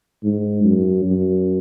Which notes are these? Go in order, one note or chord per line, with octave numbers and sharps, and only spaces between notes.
G#2
F#2
F#2